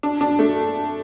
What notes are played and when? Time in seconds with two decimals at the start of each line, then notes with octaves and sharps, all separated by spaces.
0.03 D4
0.21 D4
0.39 A3